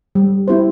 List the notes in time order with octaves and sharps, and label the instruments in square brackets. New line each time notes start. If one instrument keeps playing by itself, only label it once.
[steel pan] G3
C4 E4 G4 C5